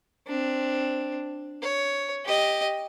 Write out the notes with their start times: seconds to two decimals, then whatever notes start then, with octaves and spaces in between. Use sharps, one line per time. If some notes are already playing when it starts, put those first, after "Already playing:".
0.27 C4 D4
1.62 C#5
2.25 G4 D#5